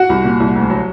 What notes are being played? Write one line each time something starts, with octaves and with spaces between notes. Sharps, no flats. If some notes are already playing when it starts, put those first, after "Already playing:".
Already playing: F#4 F#5
C2
A#2
C2
D2
F#3